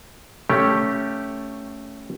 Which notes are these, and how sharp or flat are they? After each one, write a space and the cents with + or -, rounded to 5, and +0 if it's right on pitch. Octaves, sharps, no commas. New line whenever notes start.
A3 +0 C#4 +0 G4 +0